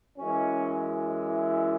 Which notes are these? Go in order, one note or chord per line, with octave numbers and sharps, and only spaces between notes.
F#2 E3 G#3 C#4
E4